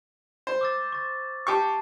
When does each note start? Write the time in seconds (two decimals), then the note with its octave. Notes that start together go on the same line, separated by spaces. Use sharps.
0.47 C5
0.61 D6 E6 A6
0.92 C#6 A6
1.47 G4 A5 C#6 C7